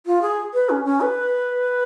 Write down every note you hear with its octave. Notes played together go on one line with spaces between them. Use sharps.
F4
G#4
B4
C#4
C#4
B4